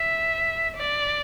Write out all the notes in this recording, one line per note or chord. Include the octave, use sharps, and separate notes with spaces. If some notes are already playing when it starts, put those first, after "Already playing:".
Already playing: E5
D5